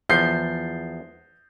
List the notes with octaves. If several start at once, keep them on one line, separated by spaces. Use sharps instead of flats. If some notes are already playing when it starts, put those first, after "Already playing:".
E2 F3 G6 C7